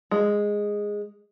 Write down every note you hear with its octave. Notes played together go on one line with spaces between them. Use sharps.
G#3